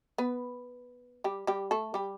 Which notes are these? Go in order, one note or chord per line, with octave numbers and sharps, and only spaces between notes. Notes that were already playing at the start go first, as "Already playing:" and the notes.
B3 B4
G3 G4
G3 G4
A3 A4
G3 G4